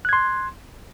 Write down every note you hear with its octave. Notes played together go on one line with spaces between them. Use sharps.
C6 F#6 G#6